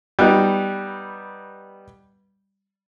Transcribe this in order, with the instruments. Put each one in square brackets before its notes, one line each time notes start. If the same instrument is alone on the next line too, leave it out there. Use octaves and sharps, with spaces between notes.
[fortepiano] G3 B3 D#4